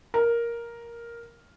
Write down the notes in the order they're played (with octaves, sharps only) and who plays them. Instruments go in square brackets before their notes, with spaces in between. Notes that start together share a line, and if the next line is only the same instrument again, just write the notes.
[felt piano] A#4